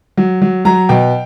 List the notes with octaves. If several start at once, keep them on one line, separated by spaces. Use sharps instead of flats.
F#3
F#3
F#3 A#5
B2 G5